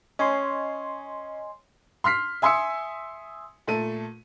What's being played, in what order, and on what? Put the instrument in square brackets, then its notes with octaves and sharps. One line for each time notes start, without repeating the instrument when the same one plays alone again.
[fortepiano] C#4 [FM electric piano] D#5 G#5 C6
[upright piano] C6 F6 B6 C7
E5 G#5 C6 D#6 E6 C#7
A#2 A3 A4 D#7